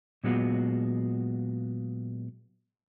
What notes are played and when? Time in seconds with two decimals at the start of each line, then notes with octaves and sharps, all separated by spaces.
0.24 A#2 F#3 G#3 B3 F4 F#4